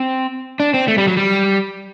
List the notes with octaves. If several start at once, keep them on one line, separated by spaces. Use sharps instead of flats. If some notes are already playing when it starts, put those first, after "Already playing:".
Already playing: C4
D4
C4
A3
G3
F#3
G3